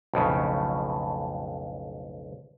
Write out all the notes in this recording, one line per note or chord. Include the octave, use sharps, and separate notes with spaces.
B1 F2 A2 C#3